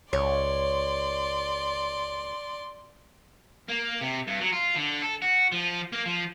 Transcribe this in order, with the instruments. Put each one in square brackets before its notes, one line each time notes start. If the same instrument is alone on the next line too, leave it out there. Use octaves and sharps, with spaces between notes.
[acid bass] C#2 [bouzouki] C#5 [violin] D5 C6
[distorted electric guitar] A#3
C3
G2
F#3
F4
D3
A4
F#4
F3
A#3
F3